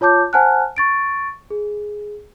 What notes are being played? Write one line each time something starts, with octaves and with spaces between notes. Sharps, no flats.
F4 C#5 A5 D6 G6
C5 F#5 G#5 A5 F6 F#6
C#6 A6 D7
G#4